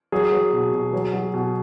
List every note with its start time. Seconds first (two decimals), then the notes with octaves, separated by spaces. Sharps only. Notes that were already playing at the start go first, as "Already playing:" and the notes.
0.12 F#3 G#4
0.32 F#3
0.53 B2
0.73 B2
0.93 F#3
1.14 F#3
1.34 B2